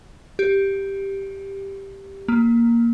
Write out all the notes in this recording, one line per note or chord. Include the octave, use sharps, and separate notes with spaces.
G4
A#3